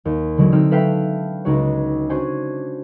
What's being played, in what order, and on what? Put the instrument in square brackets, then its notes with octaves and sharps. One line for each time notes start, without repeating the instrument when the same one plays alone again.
[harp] D#2
D3 E3 F#3 G#3
D3 C4 D#4 E6 F6
A4 B4 E5 F5 G5 B5
C#2 G#3 D#4 F#4 C#5
C#4 D4 F#4 C5 G#5